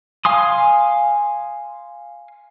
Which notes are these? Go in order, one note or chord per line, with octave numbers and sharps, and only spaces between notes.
F5 G#5 C6 D#6